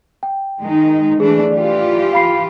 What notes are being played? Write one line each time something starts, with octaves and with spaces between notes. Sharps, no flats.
G5
D#3 G#3 D#4
E3 A3 D4 G#4
E3 F4 G4 D5
F5 B5 C7